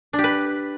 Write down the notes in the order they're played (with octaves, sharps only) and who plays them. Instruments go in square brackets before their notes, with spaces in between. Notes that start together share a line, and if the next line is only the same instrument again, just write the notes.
[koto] D4
G4
B4